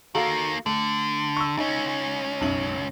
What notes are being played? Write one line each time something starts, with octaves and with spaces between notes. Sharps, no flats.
D#3 A#3 F#4 A4 F5
D3 A3
C#6 E6
C#2 C#4 D#4
B1 F#2 F#7